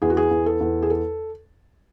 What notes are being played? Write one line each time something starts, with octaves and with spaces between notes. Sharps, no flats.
E2 G#4
F#4
G#4
E2
A4
E2
G#4
A4